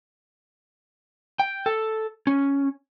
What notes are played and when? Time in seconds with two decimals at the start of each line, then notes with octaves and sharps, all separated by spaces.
1.40 G5
1.66 A4
2.27 C#4